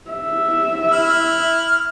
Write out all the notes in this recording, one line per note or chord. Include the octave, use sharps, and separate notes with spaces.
E5
E4 F6